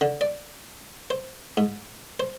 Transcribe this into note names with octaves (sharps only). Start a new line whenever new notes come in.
D3
D5
C5
G#2
C5